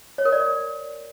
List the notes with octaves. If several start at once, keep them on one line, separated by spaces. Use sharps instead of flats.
C#5
A#4
D5